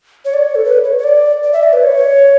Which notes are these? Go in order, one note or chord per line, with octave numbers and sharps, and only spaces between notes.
C#5
D5
C#5
A4
B4
C#5
C#5
D5
D5
E5
D5
B4
C#5